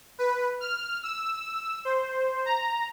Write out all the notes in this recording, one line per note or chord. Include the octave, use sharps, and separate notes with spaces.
B4
F6
E6
C5
A#5